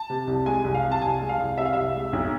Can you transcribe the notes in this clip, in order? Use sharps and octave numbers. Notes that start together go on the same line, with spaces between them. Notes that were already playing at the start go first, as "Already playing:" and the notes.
Already playing: A5
C3
C2
G#3 G#5
C2
F5
C3
A5
C2 G#5
G#3
F5
C2
C3 E5
F5
C2 E5
G#3
B1